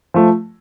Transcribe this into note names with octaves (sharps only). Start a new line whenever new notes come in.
F3 A3